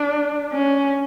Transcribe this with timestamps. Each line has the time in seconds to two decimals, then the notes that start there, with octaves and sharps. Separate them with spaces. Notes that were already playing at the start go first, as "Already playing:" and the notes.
Already playing: D4
0.53 C#4